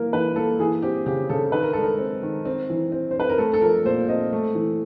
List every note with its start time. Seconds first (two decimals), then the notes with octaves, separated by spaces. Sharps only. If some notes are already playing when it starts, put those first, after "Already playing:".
Already playing: E3 A#3 A#4
0.13 E3 B4
0.36 A#3 A4
0.59 E3 G#4
0.82 C4 G4
1.06 C#3 G4
1.29 C#3 A4
1.52 D#3 B4
1.63 A#4
1.73 G#3 A4
1.83 A#4
1.99 C4
2.22 D#3
2.45 C4
2.70 E3
2.92 C4
3.11 C5
3.16 C4 B4
3.30 A#4
3.38 A3 A4
3.54 A4
3.62 F3 A#4
3.85 A#2 C5
4.08 C4 D#5
4.32 A3
4.55 E3